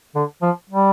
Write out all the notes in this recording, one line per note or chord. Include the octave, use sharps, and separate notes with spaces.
D3
F3
G3